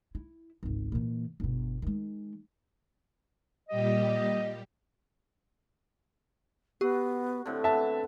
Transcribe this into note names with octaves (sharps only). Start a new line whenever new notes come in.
E4
G#1 C#2
A#2 E3
G1 B2
D#3 G#3
A#2 G3 G4 D#5
B3 F#4 G4
A2 D3 C4
B3 E5 A5